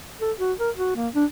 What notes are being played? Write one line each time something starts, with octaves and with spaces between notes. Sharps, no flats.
A4
F#4
A#4
F#4
A#3
D4